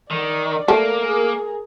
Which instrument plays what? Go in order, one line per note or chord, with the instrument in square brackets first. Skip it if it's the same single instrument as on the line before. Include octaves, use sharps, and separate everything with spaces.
[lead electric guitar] D#3 [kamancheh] D5
[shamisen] A3 [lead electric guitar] A#3
[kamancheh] G#4 A#4